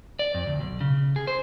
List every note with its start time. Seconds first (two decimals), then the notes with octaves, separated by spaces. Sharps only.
0.19 D5
0.34 F2
0.47 D2
0.60 B1
0.81 C#3
1.16 G#4
1.27 C5